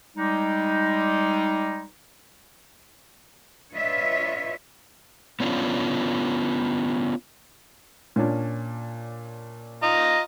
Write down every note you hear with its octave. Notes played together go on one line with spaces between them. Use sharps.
G3 G#3 D#4
D4 F4 B4 C#5 D#5 E5
B3 C#4 D4 E4 F4
A#2 C#4 D4
F4 D#5 A#5